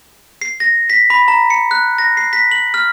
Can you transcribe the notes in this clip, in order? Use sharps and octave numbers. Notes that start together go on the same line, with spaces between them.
C7
A#6
B6
B5
A#5
C#7
F#6
A#6
C7
B6
F#7
F6